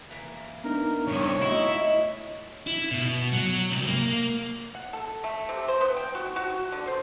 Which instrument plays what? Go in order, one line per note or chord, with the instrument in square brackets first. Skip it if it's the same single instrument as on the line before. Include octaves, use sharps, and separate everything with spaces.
[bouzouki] E3 A#3
[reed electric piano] B3 D4 D#4 [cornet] A#4
[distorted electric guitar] C2 [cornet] C#5
[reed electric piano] A3 F#4 F#5 [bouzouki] D#4 D#5 [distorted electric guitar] E4
[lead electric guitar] E4
B2
F#3
C2
A#3
[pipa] F#5
A4
A3
C3
C5
B3
G5
F#4
F#4
D3
C5